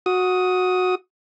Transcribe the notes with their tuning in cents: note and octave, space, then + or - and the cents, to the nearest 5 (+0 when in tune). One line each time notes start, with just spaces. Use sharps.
F#4 -15 D#6 +10